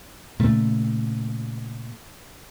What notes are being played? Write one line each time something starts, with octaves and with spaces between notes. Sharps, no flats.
A#2 C#3 A3